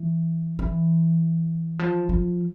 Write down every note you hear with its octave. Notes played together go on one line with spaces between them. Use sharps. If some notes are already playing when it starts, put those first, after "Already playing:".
Already playing: E3
E3
F3
F3